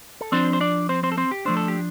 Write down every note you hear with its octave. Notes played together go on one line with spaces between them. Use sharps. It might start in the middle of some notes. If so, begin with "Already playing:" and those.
A4
F3 C4 D4 C5
C5
D4 D5
C4 C5
C4 C5
A4
C4 C5
G4
F3 A3 D4 C5
A4
G4